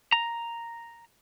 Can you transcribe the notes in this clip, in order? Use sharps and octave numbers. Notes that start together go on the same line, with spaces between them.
A#5